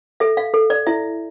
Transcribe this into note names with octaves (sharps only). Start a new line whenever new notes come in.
A4 E5
F5
A4
D5
E4 E5